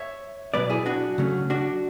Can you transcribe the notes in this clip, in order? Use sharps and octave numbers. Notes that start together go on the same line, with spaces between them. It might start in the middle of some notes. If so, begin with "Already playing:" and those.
Already playing: C#5 E5
B2 F#3 B3 B4 D5
E4 G#4
D4 F#4
C#3 F#3 A3 C#4
D4 F#4